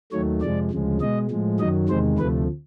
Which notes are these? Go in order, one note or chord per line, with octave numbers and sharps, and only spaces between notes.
D#2 D#3 F#3 A3 C#5
F2 C3 F3 G#3 D5
D2 C#3 F3 G#3
B2 G#3 D#5
A2 F3 G#3
F#2 D#3 F#3 D#5
E2 C3 D#3 G#3 C5
D2 C3 F3 A3 B4